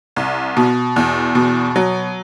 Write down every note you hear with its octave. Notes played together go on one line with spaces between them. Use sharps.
C2
B2
E2
B2
F#3